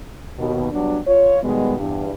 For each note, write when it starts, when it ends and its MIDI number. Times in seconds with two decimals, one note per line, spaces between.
0.37 0.67 39
0.37 0.67 47
0.73 0.97 54
0.73 0.97 55
0.73 0.97 59
0.73 0.97 62
1.06 1.40 65
1.06 1.40 73
1.42 1.76 47
1.42 1.76 51
1.42 1.76 55
1.42 1.76 56
1.42 1.76 59
1.77 2.10 40
1.77 2.10 43